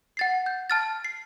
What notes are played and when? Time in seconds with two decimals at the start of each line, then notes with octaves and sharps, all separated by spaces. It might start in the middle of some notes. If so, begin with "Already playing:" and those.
0.17 F#5 A6 C7
0.46 G6
0.70 A5 F6 A6
1.05 C7